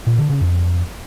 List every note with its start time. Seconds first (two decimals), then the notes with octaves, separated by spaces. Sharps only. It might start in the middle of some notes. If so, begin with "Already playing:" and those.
0.07 A#2
0.18 D3
0.30 C#3
0.41 F2